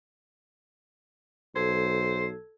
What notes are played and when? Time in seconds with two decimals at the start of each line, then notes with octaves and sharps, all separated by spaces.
1.56 B1 A4 C5 G#6